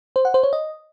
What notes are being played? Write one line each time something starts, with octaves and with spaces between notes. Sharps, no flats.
C5
F#5
C5
C#5
D#5